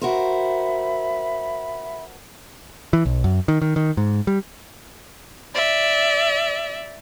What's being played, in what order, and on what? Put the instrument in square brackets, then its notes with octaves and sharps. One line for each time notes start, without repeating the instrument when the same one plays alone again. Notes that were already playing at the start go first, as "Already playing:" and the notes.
[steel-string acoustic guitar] F#4 A#4 C5 [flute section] E5 B5
[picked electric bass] E3
B1
F#2
D#3
D#3
D#3
G#2
G3
[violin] D5 E5